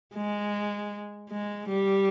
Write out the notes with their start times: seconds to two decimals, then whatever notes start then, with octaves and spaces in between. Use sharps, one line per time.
0.15 G#3
1.30 G#3
1.69 G3